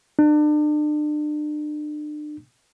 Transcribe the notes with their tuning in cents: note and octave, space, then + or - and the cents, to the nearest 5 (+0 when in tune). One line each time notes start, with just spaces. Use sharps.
D4 +35